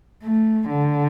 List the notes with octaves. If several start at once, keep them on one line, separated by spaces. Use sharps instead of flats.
A3
D3